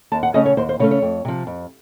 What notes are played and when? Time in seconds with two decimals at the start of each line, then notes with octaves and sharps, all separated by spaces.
0.12 D#2 A5
0.23 F#5
0.34 C#3 A3 C#4 D#5
0.46 C#5
0.57 D#2 C5
0.69 C5
0.79 C#3 A3 C#4 C#5
0.91 C#5
1.02 F2
1.25 C3 F3
1.47 F2